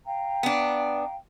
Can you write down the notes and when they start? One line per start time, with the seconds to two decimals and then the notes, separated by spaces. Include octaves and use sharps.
0.06 F5 G5 A#5
0.43 B3 D4